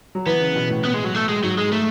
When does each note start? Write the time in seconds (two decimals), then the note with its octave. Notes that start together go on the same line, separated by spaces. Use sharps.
0.15 F#3
0.26 E3 B3
0.41 C#3
0.55 B2
0.70 A2
0.85 A2 B3
0.94 G#3
1.04 F#3
1.15 A3
1.29 G#3
1.43 G#2 F#3
1.58 G#3
1.72 A3